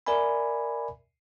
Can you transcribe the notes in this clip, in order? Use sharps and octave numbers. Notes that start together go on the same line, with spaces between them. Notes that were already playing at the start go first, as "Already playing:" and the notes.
A#4 D5 E5 G#5 B5